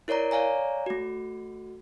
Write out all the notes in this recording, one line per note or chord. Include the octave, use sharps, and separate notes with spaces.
E4 A#4 C#5 D5 A#5
C#5 D5 F5 G#5 A#5
A3 F#4